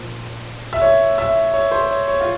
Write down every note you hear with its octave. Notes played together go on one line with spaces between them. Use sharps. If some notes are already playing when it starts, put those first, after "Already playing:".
Already playing: A#2 F3 C5
E5
C#5
E5
C#5
C5
C#5
C#5
F4